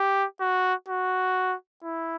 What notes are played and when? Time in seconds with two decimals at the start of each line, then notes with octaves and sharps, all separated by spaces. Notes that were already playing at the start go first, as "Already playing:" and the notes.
Already playing: G4
0.41 F#4
0.88 F#4
1.84 E4